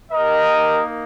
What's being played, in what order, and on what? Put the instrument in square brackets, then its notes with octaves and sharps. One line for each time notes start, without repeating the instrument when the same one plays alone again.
[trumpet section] A#3 D#4 G4 A#4 D#5